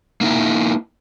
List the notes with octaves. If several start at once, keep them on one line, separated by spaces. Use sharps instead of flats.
A#3 D#4 E4